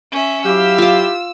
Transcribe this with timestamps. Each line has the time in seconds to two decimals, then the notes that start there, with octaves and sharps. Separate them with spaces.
0.12 C#4 E5
0.45 F#3 E4 G4 F5 E6
0.78 F4 D6